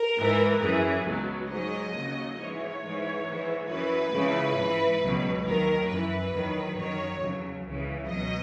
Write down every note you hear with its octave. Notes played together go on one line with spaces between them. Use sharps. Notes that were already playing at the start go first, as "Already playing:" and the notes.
Already playing: A#4
G#2 E3
F#2 E3 G#4
C#2 B2 F#3
G#2 F#3 D#5
D#2 C#3 F#3
G#2 E3 C#5
G#2 E3
G#2 E3
F#2 E3 B4
C#2 C#3 E3
G#2 E3
C#2 B2 F#3
D#2 D#3 F#3 A#4
F#2 E3 B4
E2 D#3 F#3
F#2 D#3 F#3 C#5
E2 C#3 F#3
C#2 C#3 E3
C#2 B2 F#3 D#5